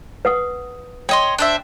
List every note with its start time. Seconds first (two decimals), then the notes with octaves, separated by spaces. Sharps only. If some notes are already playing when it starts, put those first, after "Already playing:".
0.25 B4 F#5 D#6
1.09 C#5 D#5 G5 B5 C6
1.38 D4 C5 E5